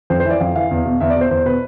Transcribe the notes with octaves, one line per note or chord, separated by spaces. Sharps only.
F2 C5
C5
E3
D5
F2 F5
E3 F5
E2
B2
E2 E5
D5
B2 C5
E2 C5
B2 B4